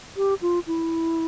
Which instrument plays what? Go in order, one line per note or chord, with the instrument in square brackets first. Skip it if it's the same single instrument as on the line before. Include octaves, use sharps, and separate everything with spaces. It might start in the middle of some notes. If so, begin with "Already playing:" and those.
[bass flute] G4
F4
E4